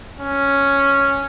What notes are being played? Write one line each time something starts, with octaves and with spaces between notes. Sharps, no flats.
C#4